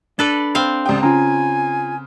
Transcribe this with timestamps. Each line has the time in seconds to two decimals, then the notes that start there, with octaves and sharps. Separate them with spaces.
0.19 D4 A4 B4 D5
0.55 C4 F5
0.86 C#2 G4 D5 G5 D#6
1.03 C#3 F4 G5 G#5 A#5